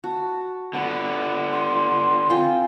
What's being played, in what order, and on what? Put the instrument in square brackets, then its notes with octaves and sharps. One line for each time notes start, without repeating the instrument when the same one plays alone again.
[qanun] F#4 [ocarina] A5
[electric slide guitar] D3 B3 [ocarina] F#5
[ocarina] C6
[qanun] C4 F4 G5 [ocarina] G#5